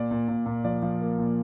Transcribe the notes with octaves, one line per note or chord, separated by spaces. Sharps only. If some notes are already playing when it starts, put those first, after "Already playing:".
Already playing: A#2 D5
A#2
A#2
A#2
F3 D5
F3
A#3
A#2